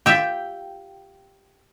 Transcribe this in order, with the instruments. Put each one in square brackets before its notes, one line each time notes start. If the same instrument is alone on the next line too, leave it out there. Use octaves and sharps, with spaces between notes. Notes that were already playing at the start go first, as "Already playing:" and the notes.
[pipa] F4 G5 [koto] G4 E5